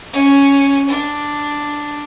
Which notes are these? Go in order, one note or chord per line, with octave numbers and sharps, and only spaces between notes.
C#4
D4